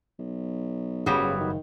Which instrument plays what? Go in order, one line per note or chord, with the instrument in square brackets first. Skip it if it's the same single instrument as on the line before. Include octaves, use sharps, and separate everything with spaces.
[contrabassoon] B1
[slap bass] F#1 G#2 [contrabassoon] C#3 [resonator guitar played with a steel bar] F#3 G3 B3
[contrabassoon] D#3